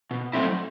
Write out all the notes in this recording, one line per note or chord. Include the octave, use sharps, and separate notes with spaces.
B2
F#3 A3 C4 E4